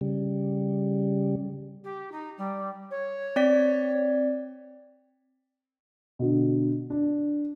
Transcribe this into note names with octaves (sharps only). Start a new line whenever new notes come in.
C#3 G3
G4
D#4
G3
C#5
C4 D5 B6
B2 D3
D4